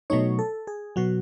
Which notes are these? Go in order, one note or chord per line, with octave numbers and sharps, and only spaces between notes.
B2 F#3 A3 D#4 C#5
A4
G#4
B2 F#3 F#4